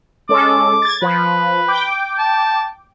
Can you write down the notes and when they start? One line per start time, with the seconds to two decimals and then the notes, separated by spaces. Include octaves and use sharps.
0.29 G#3 C#4 A4 D6
0.82 G#6 A6
1.02 F3 B4
1.68 G5 D6
2.18 A5